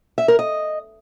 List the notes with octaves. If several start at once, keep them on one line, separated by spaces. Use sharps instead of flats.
E5
A#4
D#5